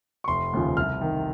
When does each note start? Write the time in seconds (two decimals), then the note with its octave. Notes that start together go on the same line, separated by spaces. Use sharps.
0.24 C#6
0.28 F1 C6
0.53 D#2 C#3 F3
0.77 C2 F6
1.01 C3 D#3